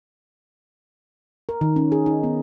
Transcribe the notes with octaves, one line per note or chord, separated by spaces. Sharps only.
A#4
D#3
C#4
G#4
D#4
B3